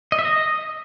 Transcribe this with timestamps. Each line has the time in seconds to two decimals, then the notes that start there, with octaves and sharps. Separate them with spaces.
0.12 D#5
0.19 E5
0.25 D#5